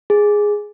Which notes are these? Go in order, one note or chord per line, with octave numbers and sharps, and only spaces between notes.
G#4